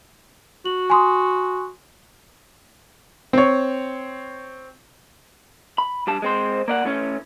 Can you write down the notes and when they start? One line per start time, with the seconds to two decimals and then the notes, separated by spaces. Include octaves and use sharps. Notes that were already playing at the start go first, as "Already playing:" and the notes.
0.65 F#4 F#7
0.90 G#5 C6 D#6
3.33 C4 C#5
5.78 B5
6.07 G2 G4 A5
6.22 G#3 C4 C5
6.68 A#3 D5 F#5
6.85 A2 A3 C#4